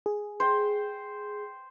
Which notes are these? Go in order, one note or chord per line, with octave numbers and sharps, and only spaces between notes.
G#4
C5 G5